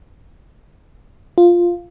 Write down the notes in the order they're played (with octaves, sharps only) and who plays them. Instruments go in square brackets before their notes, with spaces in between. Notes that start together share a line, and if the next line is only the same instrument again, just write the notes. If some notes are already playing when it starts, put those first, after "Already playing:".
[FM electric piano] F4